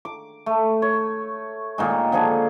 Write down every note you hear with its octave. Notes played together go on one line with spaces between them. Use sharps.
D6
A3
C#5
A#2 D#3 G#3
D3 F3 D4 G#4